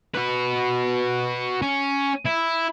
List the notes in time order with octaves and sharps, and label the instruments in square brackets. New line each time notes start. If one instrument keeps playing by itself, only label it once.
[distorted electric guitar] F#4 B4
C#4
E4